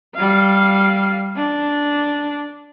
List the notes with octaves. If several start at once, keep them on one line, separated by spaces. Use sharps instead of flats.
G3 F5
D4